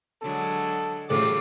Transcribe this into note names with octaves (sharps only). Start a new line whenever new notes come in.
D3 F#3 G#3 A4
A2 C#3 E3 G3 A3 F4 D6